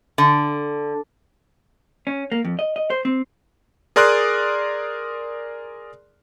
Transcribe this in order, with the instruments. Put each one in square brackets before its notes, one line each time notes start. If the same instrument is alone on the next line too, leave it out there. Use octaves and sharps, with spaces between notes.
[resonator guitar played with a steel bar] D3
[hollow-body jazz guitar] C#4
A#3
F2
D#5
D#5
C5
C4
[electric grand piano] G#4 A#4 D5 C6 D#6 F#6